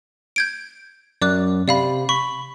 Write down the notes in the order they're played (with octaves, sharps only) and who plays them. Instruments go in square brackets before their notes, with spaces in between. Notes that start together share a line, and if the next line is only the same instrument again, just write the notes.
[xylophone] G6 G#6 D7
[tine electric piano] F#2 [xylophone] D5 D6 F#6
[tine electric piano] C3 [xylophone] D5 F5 B5
[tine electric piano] B5 [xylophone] C#6